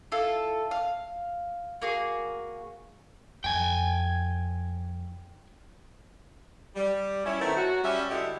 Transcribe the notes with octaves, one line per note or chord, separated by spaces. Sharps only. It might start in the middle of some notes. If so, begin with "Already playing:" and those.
E4 F4 A4
F5
A#3 F#4 G#4
F2 G5 G#5
G3
C#4 E4
D#3 A3 B3 C4 E4
F#3 F#4
G3 C#4 E5
D3 G3 G#3 E4 F#4 G4